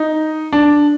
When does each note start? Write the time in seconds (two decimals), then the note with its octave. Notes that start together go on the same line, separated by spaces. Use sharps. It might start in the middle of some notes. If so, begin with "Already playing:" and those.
Already playing: D#4
0.52 D4